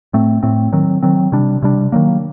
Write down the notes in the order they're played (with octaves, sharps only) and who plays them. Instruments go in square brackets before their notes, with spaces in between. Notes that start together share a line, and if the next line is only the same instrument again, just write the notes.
[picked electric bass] A2 A3 C4
A2 A3 C4
D#3 F#3 C4
D#3 F#3 C4
C3 G3 D4
C3 G3 D4
D#3 F#3 A#3